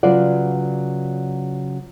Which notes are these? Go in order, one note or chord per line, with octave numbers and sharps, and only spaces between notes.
C#3 F#3 F4 B4 D5 F#5